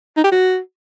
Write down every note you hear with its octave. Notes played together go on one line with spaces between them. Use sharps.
D#4
G4
F#4